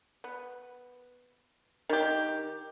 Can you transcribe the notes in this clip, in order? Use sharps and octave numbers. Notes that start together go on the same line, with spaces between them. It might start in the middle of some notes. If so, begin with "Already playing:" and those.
B3
D#3 G4